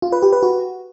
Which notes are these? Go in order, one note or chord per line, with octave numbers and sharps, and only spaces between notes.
F4
B4
G4
B4
F#4